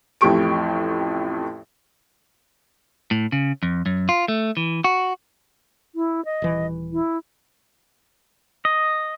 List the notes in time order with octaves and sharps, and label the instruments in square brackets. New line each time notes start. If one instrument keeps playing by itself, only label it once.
[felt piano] A1 F2 A2 G4 C#6 D7
[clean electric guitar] A2
C#3
F2
F#2
F4
A3
E3
F#4
[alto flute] E4
D#5
[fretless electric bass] D#1 E3
[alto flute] E4
[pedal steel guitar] D#5